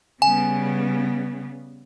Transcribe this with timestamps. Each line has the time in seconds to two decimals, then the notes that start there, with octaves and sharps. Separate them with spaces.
0.22 C#3 G3 B3 G#5